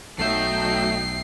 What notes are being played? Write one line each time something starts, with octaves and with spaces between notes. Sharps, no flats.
B1 F#3 A3 D#4 E5 G5 C7